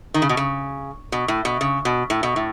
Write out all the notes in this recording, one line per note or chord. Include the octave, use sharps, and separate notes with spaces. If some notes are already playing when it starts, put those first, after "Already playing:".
D#3
C#3
B2
C#3
B2
A2
B2
C#3
B2
A2
B2
A2